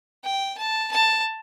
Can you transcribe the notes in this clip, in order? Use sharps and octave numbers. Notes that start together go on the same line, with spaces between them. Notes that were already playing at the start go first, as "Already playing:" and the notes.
G5
A5
A5